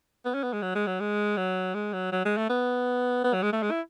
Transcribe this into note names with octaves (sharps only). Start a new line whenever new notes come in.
B3
C#4
B3
G#3
F#3
G#3
F#3
G#3
F#3
G#3
F#3
F#3
G#3
A3
B3
B3
F#3
G#3
A3
G#3
E4